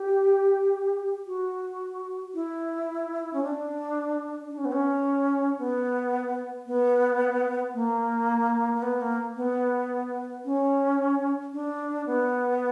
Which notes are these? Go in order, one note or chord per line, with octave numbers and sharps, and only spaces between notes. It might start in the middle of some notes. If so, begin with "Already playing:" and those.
Already playing: G4
F#4
E4
C#4
D4
D4
C#4
B3
C#4
B3
B3
A#3
A#3
B3
A#3
B3
C#4
D4
B3